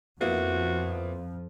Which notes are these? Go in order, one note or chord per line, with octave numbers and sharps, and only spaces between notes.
F2 F3 A#3 B3 E4 F#4